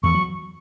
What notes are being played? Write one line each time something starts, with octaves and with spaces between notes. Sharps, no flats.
E2 E3 C#6
F#3